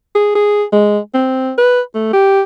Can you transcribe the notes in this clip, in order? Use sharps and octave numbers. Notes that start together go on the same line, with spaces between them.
G#4
G#4
G#3
C4
B4
A3
G4